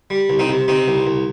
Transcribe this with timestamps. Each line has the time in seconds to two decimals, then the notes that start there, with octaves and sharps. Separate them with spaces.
0.10 G3
0.29 C2
0.39 C4 D#4
0.49 C3
0.68 C3 C4 D#4
0.88 C2
1.07 C2